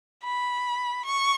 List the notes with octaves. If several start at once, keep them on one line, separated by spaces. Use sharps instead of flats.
B5
C#6